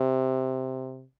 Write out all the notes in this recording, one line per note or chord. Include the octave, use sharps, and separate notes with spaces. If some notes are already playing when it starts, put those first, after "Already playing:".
Already playing: C3